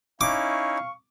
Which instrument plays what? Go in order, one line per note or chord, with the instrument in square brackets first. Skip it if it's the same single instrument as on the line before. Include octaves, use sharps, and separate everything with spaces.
[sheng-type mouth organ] C#4 D#4 E4 [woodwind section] F5 C#6 [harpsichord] D6